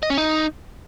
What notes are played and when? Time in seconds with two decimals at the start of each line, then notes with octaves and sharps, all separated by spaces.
0.03 D#5
0.10 C#4
0.18 D#4